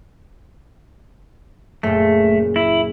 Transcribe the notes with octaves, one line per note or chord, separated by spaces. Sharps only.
F#1 A#2 A3
E4